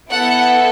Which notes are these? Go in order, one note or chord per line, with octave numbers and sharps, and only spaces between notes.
B3 E4 A4 F#5